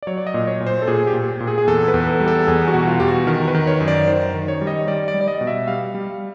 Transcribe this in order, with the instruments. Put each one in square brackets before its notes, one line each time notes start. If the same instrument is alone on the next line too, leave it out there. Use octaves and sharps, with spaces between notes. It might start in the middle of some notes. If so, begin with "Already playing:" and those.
[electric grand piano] D5
F#3 C#5
D5
D#5
A#2
C#5
A#2
C5
A4
A#2 G#4
G4
A#2
A#2
G#4
G#4
E2 A4
B4
E2
A4
G3
A4
E2 G#4
F#4
B2
F4
E2 G4
F#4
D#3 A#4
B4
D#3
C#5
F#2
D5
D#3 C5
D#3
C#5
G3
D#5
G3 D5
D5
G3
D5
D#5
B2
E5
G3 F5
G3